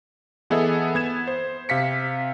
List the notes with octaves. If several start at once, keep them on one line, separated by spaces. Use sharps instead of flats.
E3 B3 G#4 A4 D#5 E5
B3 G#6 E7
C5
C3 F5 B6 C#7